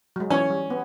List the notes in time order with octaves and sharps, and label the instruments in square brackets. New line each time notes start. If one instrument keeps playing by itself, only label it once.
[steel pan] F#3 G#3
[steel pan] E3 C#5 [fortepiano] C#4
[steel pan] G3
B3